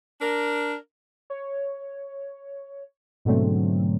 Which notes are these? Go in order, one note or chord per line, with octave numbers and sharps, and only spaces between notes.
D4 A#4
C#5
G#2 B2 D3 F#3 A3 C4